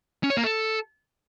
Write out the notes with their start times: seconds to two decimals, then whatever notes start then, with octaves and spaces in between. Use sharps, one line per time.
0.23 C#4
0.30 C#5
0.37 A#3
0.44 A4